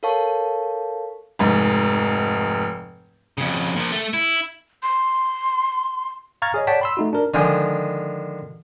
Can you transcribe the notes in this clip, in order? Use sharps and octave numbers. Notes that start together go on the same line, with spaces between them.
A4 A#4 C#5 F5 A5 C#6
F1 G#2
F2 C#3
A#2 F3
A3 A4
E4
C6
F5 A#5 C#6 F6 G#6 A6
G#4 C#5 D#5
C#5 D5 F#5 G5 A5 B6
B5 C6 E6
A3 D#4 F#4
D4 A#4
D3 D#3 F3 G#3 G#4 G5